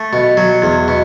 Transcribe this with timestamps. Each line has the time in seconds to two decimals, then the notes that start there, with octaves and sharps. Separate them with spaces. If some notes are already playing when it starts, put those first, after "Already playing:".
Already playing: A3
0.13 B2
0.37 F#3
0.62 E2
0.88 B2